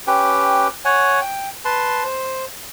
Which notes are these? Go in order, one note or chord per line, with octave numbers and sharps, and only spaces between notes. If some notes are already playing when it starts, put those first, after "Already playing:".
C#4 G4 B4 G5
C#5 F#5 G#5
G5
B4 A5 C6
C5